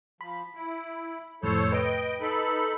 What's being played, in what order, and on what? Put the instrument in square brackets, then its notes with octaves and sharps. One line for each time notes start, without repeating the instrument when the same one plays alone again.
[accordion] F3 [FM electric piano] B5
[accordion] E4
[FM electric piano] F2 A2 C3 [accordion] A4 C5 C#5
[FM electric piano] B4 [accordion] D#5 G5
[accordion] D#4 A4 B5